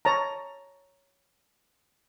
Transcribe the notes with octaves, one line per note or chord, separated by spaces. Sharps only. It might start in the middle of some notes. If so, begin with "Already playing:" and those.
C#5 A5 A#5